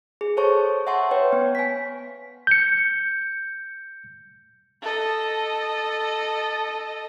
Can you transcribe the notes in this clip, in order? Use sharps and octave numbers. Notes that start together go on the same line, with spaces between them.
G#4
A4 C5 C#5 A5 C#6
E5 F#5 A5 C6 C#6
B4 C#5 G5
B3
G#5 B6
G6 C#7
A4 D#5